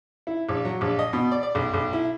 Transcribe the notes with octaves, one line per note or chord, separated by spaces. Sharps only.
E4
A#1
F#3
A#1
D#5
B2
D5
D5
B1
B1
E4